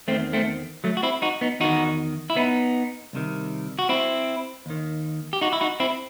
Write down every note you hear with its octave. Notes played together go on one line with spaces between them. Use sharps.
E2 D#3 A3 C4
A3 C4
F#3 A3
F#4
C4 E4
D#4 F#4
B3 D#4
E2 D#3 D#4 F#4
E4
B3 D#4
C2 C3 D#3
F#4
C4 E4
D#2 D#3
G4
D#4 F#4
E4
D#4 F#4
C4 E4